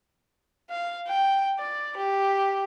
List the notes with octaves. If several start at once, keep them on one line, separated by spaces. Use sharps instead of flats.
F5
G5
D5
G4